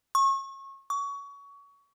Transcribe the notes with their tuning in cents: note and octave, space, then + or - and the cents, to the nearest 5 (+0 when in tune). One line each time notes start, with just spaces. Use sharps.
C#6 -30
C#6 +25